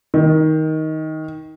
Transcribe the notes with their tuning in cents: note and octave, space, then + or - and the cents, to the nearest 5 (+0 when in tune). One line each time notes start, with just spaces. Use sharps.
D#3 +15